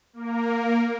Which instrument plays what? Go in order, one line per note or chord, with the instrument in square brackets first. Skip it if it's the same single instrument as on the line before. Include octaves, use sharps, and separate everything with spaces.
[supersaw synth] A#3 A#4